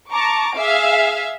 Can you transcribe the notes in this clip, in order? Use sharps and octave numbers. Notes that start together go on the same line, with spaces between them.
A5 A#5 C#6 D6
G#4 E5 F5